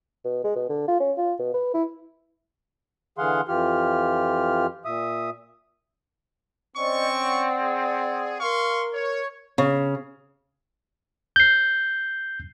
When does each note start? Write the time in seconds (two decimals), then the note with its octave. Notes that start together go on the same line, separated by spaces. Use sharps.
0.24 B2
0.44 G#3
0.56 B2
0.69 D3
0.88 F4
1.00 C#4
1.17 F4
1.39 B2
1.54 B4
1.74 E4
3.18 D3 E3 G#4 F5 F#5 C6
3.48 F2 E3 F4 G4 F6
4.85 A#2 E5 D#6
6.76 C4 C#4 C5 D5 D#5 C#6
7.18 D5 F#5
7.60 G#4
8.40 A#4 F5 C6 C#6
8.94 C#5
9.58 C#3
11.36 G6 C7